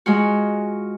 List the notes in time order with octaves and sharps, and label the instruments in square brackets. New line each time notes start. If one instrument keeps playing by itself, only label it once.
[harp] G#3 F4 F#4